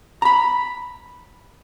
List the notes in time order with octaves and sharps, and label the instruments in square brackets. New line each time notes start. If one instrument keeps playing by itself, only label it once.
[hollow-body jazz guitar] A#5 B5